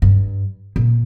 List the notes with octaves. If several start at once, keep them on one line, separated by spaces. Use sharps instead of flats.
G2
A#2